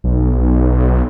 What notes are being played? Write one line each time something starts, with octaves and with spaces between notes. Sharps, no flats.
B1